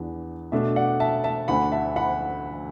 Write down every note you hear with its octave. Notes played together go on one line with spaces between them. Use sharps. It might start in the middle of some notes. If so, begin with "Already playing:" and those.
Already playing: E2 E3 B3 D4
B2 A3 D4 E5
D5 F#5
E5 A5
E5 A5
D2 D3 A3 D4 F#5 B5
E5 A5
F#5 B5